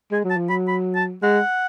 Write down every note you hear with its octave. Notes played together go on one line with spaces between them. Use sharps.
G#3 G#5
F#3
A5
F3
F#3 B5
B5
A5
G#3 F#5